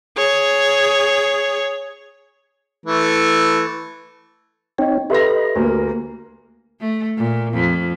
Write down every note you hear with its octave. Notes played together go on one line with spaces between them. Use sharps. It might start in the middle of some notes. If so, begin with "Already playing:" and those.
G#4 C#5
E3 A3
C4 D#4 C#5 D#5 G5
G4 A4 B4 D#5 E5 B5 C6 A#6
D2 A#3 A#4
A3
A#2
F2